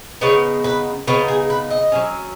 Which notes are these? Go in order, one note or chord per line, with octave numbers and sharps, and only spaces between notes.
C#3 B3 D#4 C#5
B4
C#3 B3 D#4 C#5
G#4
B4
D#5
F#3 C#4